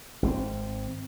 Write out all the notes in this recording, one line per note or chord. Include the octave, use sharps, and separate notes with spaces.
G#1 D3 C4